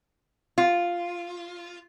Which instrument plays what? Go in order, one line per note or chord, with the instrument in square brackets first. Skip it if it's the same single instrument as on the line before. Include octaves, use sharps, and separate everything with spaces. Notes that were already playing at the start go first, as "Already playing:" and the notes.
[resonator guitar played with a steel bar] F4